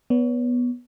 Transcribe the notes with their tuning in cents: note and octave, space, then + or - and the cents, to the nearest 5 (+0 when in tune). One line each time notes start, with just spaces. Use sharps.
B3 -10 C#5 +30